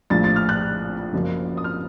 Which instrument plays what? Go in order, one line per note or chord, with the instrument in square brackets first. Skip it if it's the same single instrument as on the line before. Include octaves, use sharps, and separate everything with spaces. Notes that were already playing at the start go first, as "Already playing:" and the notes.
[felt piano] A#1 A2 F3 A6
A6
F6
F#6
F#1 F#2 F3 A#3
D#6
F6